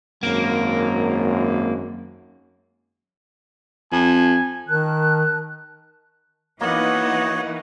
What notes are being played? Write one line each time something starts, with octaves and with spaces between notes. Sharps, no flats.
G#1 F#2 A#3
F2 G#5
D#3 A#4 A5 F#6
E3 A#3 B3 D#4 F#4 C#5 D#5 F#5